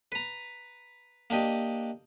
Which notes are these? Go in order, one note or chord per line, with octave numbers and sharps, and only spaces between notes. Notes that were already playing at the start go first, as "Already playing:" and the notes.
B4 A#5
A#3 D4 G4 D#5